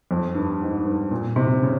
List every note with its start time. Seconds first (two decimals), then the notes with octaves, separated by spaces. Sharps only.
0.11 F2
0.35 G2
0.61 G#2
0.85 G2
1.11 A#2
1.36 C3
1.62 C#3